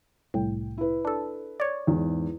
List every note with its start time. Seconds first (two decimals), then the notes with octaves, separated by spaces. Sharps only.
0.34 C2 A2 G5
0.77 E4 B4
1.05 D4 A4
1.60 C#5 D5
1.87 E2 G#2